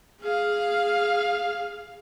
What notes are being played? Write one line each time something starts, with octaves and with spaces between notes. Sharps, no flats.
G#4 F5